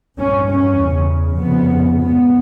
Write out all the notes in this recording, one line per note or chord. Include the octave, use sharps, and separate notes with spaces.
G2 C#4
C#4
E2 C#3
F2 C#3 B3
G#2 B3